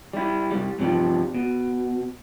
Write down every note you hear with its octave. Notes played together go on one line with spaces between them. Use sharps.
G3 E4
C2 F#2 G3
G2 C3 F3 G3
B2